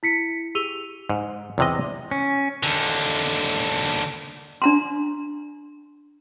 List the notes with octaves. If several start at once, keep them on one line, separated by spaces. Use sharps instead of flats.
E4 B6 C#7
G4 G#4 E6 D#7 F7 G7
G#2
E2 C3 D#5
C#4
D#2 D3
D4 A#5 C6